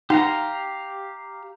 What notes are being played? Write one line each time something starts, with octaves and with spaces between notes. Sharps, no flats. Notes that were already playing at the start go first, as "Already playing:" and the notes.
D#4 G4 F5 A#5